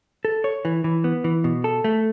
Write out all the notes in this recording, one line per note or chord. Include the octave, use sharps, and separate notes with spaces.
A4
C#5
E3
E3
B3
E3
B2
A4
A3